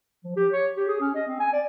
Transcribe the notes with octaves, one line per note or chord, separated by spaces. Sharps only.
F3
G4
C#5
G4
G#4
C#4
D#5
C4
G#5
D5